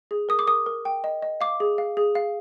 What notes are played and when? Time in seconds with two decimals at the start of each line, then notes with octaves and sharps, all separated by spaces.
0.11 G#4
0.29 A#4 D#6
0.39 D6
0.47 A#4 D#6
0.66 A#4
0.85 G5
1.04 D#5
1.22 D#5
1.41 F5 D6
1.60 G#4
1.78 F5
1.97 G#4
2.15 F5